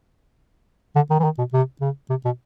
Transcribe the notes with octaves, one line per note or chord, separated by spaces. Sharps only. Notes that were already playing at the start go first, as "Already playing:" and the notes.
D3
D#3
E3
D#3
B2
C3
C#3
C3
B2